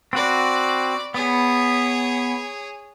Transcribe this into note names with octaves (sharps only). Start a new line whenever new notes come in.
C4 F#4 D5 B5
B3 G#4 C#5